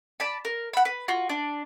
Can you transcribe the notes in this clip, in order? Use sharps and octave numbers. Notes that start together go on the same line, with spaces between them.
D5 A5 B5
A#4
F#5 B5
B4
F4 F#4
D4